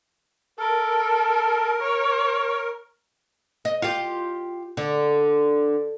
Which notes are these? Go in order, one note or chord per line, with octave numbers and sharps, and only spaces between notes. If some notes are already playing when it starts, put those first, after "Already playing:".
A4 A#4
C#5
D#5
F4 G4
D3